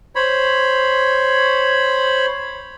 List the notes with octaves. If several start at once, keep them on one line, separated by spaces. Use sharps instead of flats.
C5 C#5 B5